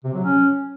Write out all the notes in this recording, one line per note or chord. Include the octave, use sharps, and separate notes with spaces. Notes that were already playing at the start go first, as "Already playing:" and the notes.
C3
F#3
C#4